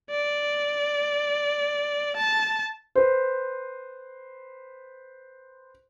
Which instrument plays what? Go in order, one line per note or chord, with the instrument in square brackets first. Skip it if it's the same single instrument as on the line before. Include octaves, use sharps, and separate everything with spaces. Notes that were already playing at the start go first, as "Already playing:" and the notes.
[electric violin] D5
A5
[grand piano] B4 C5